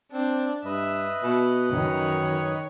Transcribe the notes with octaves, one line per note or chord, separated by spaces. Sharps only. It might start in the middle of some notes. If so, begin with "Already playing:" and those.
C4 D4
G2 B4 D#5 E5
B2
F#2 D#3 C#5